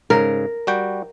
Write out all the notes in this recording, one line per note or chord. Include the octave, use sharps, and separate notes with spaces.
G#2 C#3 A#4
G3 F#4 G5